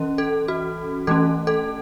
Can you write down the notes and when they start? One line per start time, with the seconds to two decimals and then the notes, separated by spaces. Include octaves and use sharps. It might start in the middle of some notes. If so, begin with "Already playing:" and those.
Already playing: E3 C#4
0.18 A4
0.48 F#4
1.07 E3 A3 C#4 A4
1.47 A4